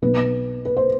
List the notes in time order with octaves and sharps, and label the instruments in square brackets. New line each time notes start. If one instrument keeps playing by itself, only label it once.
[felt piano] B1 B2 B3 B4
B4
C5